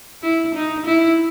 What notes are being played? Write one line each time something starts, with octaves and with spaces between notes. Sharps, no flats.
E4
D#4
E4